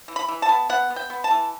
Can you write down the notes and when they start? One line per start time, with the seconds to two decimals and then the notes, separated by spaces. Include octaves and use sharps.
0.08 E3
0.16 B5
0.28 E3
0.42 A5
0.49 B3
0.69 B3 F#5
0.90 B3
0.96 G5
1.10 B3
1.24 A5
1.31 E3